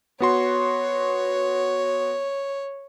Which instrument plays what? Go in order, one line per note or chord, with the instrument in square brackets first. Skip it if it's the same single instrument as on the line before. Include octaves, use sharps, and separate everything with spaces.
[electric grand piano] B3 F#4 C6 [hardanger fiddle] C#5